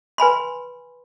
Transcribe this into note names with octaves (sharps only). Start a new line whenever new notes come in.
B4 G#5 B5 C6